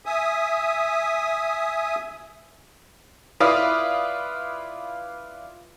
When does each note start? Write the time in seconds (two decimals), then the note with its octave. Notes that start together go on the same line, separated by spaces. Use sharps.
0.06 E5 G#5 D#6
3.40 E4 F4 B4 D5 F5 D#6